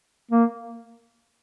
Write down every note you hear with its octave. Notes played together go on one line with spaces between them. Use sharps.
A#3